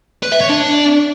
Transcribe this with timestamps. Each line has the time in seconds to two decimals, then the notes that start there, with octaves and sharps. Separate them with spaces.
0.23 B4
0.32 E5
0.41 C#5
0.49 D4